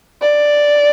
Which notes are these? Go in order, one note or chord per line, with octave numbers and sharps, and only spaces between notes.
D5